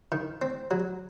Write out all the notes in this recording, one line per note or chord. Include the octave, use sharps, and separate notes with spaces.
D#3
C4
F#3